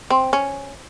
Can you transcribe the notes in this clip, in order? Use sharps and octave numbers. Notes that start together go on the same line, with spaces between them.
C4
C#4